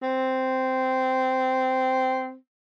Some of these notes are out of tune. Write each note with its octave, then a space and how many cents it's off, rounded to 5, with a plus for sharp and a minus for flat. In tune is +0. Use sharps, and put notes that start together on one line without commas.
C4 -10